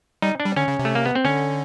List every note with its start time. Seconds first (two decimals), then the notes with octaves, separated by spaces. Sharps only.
0.22 G3 D#4
0.40 D4
0.45 G3
0.56 D3 C#4
0.68 C#3
0.79 C3
0.85 A3
0.95 A#3
1.06 B3
1.15 C4
1.25 D3 C#4